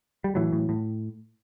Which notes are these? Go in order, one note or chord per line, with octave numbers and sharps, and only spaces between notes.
G3
A2 E3 F#3
A2
A2